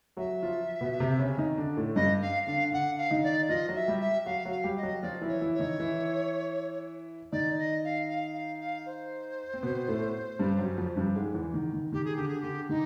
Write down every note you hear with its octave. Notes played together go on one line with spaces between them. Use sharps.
F#3 F#4 E5
F3 F4
B2 B3
C3 C4
C#3 C#4
D#3 D#4
D3 D4
A2 A3
G2 G3 D#5
F5
D3 D4 F5
D3 D4 F#5
F5
D#3 D#4
D5
F3 F4 D#5
F#3 F#4
E5
G3 G4
E5
F#3 F#4 F5
F#3 F#4
F5
G3 G4
D#5
F#3 F#4
F3 F4 D5
E3 E4
C#5
E3 E4
C#5
D#3 D#4
E3 E4
D#3 D#4 D5
D#5
F5
F5
F5
F5
C5
C4
B2 B3
A2 A3
G2 G3
F#2 F#3
F2 F3
G2 G3
G#2 G#3
E2 E3
D#3
D#3
D#3 G4
G#4
D3 G4
G#4
D3 G4
D#3 D#4